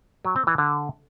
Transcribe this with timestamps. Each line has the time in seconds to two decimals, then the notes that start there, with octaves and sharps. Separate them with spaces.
0.25 F#3
0.36 C4
0.47 E3
0.58 D3